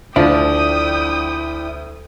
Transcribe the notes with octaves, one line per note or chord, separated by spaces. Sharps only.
D2 F3 D4 E4 G5 D#6